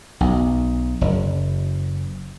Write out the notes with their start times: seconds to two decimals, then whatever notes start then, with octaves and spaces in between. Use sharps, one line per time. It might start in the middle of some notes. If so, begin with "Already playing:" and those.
0.21 B1
1.01 F#1